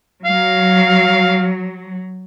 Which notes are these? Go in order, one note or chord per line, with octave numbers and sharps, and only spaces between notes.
F#3 F5